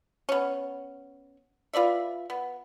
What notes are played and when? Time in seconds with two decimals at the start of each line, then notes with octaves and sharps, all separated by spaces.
0.29 B3 C#4
1.73 F4 B4 D5 E5
2.30 B3